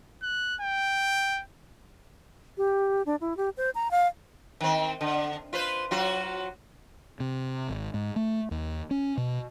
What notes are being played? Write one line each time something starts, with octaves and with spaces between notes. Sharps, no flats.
F#6
G5
G4
D4
E4
G4
C5
A#5
F5
D#3 C4
D3
F4 B4 C5
F#3 F4 F#4
C3
G#1
G#2
A3
D#2
C#4
B2